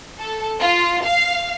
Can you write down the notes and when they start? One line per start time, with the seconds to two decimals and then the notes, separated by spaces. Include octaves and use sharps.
0.19 A4
0.60 F4
1.05 F5